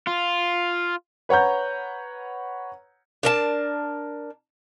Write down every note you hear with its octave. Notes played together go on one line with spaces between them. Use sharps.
F4
B4 C#5 F#5 A#5 G6
D4 A#4 A5